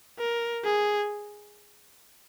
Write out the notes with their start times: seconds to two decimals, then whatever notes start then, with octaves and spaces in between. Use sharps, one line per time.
0.19 A#4
0.65 G#4